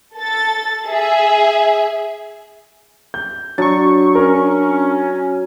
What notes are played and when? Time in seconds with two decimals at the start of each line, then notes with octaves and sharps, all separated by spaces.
0.17 A4 A6
0.87 G#4 E5
3.14 G6
3.58 F#3 D4 C#6 A6
4.15 C#4 A#4